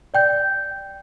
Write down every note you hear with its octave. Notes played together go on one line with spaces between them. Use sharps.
D5 G5 G6